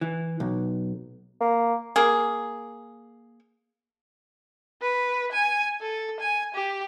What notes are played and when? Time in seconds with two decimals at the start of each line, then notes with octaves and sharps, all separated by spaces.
0.01 E3
0.40 B1
1.41 A#3
1.96 A#3 G#4
4.81 B4
5.32 G#5
5.81 A4
6.20 G#5
6.54 G4